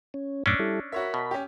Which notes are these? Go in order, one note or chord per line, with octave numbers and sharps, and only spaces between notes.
C#4
F#2 A2 C#4 D4 D6 E6
G3 E4 A4
F#4 A#4 C#5 E5 B5
B2
C#4 G4